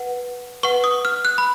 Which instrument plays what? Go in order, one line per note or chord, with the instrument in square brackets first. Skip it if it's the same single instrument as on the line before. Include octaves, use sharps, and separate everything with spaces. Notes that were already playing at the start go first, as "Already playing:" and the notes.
Already playing: [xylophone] B4 F#5
B4 F#5 C#6
D#6
F6
F#6
B5